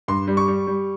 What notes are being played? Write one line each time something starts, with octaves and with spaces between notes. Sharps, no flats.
G2 C6
G3
C#6
G3
G3